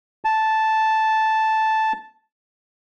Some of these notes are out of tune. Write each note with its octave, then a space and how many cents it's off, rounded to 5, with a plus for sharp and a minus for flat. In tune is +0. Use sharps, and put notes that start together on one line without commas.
A5 -5